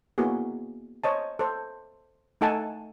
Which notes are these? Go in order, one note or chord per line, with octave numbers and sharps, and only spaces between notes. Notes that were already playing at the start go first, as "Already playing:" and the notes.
A#3 B3 E4 F#4 G#4
C5 C#5 D#5 A5
A4 C5
A3 D#4 A4 F#5 G#5 A5